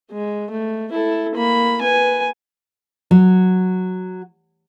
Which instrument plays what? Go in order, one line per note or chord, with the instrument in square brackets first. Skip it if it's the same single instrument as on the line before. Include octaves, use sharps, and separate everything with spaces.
[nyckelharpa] G#3
A3
E4 A4
A#3 B5
B4 G#5
[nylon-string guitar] F#3